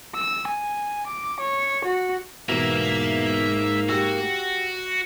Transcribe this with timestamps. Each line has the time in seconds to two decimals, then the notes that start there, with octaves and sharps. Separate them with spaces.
0.15 E6
0.47 G#5
1.07 D6
1.40 C#5
1.85 F#4
2.49 E2 G#2 B2 A#3 E5
3.89 F#4 G4 E6